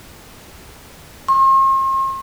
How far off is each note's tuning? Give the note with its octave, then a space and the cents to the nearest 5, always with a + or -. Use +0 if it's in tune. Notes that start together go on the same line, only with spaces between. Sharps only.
C6 +45